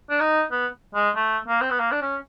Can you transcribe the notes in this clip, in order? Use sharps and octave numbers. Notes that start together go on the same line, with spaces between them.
D4
D#4
B3
G#3
A3
A#3
C4
B3
A#3
D4
C#4